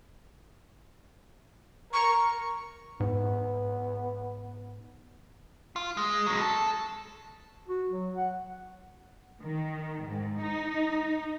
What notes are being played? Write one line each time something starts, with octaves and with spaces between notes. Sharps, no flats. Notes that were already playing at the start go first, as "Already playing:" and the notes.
A#4 C#6
G#2 B3
F4
G#3
F#3 G#3
A4
F#4
F#3
F#5
D#3
G#2
D#4